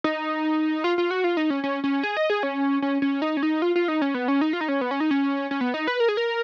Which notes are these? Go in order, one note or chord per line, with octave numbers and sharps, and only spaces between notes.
D#4
F4
F4
F#4
F4
D#4
C#4
C#4
C#4
G#4
D#5
G#4
C#4
C#4
C#4
D#4
C#4
D#4
F4
F4
D#4
C#4
B3
C#4
D#4
F4
D#4
C#4
B3
C#4
D#4
C#4
C#4
B3
D#4
B4
A#4
G#4
A#4